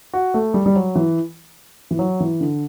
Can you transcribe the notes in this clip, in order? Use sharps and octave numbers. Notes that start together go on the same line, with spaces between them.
F#4
A3
G3
G3
F#3
E3
E3
F#3
E3
D3